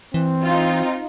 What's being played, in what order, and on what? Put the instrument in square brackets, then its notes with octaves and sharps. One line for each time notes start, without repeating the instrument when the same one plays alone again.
[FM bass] E3 [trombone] C4
[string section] D#4 F4